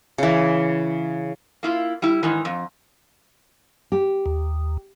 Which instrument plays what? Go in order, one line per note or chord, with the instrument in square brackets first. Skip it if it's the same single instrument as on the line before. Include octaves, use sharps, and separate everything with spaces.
[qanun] C#3 E3
[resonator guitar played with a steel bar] A#3 E4 F4
G3 E4
G#2 D#3 E3
F2
[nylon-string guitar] G4
[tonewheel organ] D#2